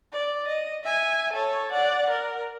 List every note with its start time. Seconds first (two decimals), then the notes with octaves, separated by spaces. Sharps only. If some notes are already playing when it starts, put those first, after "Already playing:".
0.13 D5
0.48 D#5
0.84 E5 G#5
1.33 A4 C#5
1.72 D5 F#5
2.10 A#4